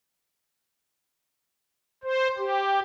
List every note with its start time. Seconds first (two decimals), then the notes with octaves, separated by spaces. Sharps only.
2.04 C5
2.38 G4